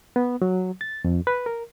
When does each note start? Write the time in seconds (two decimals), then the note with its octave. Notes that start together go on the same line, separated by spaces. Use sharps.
0.16 B3
0.42 F#3
0.81 A6
1.05 F2
1.27 B4
1.46 A#4